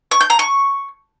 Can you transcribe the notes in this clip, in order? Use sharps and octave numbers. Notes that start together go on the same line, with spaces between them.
C#6
G6
A#5
C#6